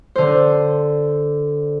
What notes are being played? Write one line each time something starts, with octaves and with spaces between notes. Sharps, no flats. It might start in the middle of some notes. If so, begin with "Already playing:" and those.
D3 C5